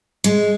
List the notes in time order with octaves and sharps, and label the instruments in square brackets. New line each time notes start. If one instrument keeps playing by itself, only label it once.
[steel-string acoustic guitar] G#3